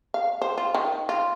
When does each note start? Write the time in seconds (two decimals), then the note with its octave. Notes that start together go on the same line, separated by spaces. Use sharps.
0.14 F5
0.42 C5
0.58 F4
0.74 D#3
1.09 F4